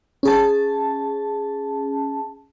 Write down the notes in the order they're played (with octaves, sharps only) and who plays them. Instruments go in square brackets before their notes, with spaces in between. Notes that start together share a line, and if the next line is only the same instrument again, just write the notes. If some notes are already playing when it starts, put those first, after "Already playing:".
[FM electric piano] C#4 G#4 A5